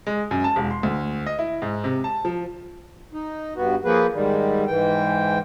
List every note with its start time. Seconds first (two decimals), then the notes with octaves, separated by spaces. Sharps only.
0.07 G#3
0.31 F#2
0.44 A5
0.56 E1
0.71 C6
0.83 D2
1.26 D#5
1.39 E4
1.62 G#2
1.84 C3
2.04 A5
2.25 F3
3.13 D#4
3.55 G2 B3 F#4
3.85 F3 A#3 G#4 B4
4.14 G#2 D#3 G3
4.67 G#2 E3 G5